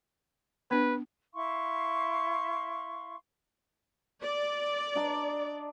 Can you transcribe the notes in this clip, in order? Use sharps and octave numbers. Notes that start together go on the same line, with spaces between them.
B3 D4 B4
E4 F5 C6 C#6
D5
D4 D#5 A#5